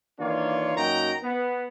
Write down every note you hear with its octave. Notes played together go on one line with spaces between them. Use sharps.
D#3 E3 A#3 D4 F4 C#5
F#2 A#3 D#4 F#4 G5 A#5
B3